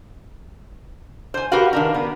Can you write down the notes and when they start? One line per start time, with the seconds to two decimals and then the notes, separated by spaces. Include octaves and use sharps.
1.34 C5 G#5
1.52 F#4 G4 A#4 B4 F5 F#5
1.73 D#3 D4 A#4
1.94 B3